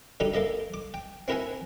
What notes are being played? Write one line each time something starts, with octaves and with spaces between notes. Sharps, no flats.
D3 G3 D#4 G4 A4
A#3 A4 D#5 E5
D6
G5
C4 E4 A#4 E5 F#5 G#5